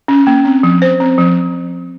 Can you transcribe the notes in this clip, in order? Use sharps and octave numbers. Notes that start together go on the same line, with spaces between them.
C#4
A#3
C4
F3
C5
C4
F3